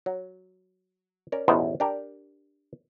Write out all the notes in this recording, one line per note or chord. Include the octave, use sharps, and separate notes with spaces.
F#3
C#4 A#4 D5
A1 E2 B2 B3 D#4 C5
D4 G4 A#4